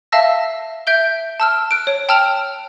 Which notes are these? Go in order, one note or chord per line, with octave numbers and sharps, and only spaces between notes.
E5 F5 A5 E6 A#6
E5 G6 D7 G7
A5 E6 F6
F#6 D7
C#5
G5 A5 E6 F6 D7 F7